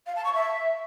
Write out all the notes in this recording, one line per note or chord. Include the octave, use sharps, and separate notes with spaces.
F5
A5
C#6
E5